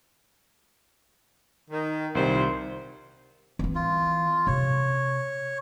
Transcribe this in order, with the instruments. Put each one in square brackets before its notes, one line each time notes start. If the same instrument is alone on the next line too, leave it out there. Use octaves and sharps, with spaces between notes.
[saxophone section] D#3
[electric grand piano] C2 D#3 G3 [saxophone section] A#2 C5
[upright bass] E3 C4
[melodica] F4
[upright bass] C3 [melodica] C#5